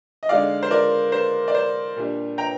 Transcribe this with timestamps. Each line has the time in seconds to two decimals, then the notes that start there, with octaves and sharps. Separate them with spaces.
0.23 D#5
0.29 D3 G#3 D#4 D5 F5
0.63 C5
0.71 A#4 D5
1.12 C5
1.48 D5
1.55 C5
1.96 A#2 G3 D4
2.38 G5 A#5